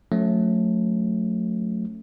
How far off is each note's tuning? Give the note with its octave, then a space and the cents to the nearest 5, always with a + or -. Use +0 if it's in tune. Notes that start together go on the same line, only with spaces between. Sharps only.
F#3 -35 A3 +0 C#4 +0